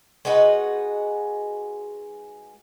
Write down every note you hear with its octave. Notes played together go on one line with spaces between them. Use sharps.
G#3 D#4 F#4 B4